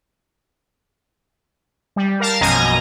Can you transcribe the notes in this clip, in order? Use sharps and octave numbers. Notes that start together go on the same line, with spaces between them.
G3
A#4 F5 A5
A#1 F#2 B2 D#5 G#5 A#5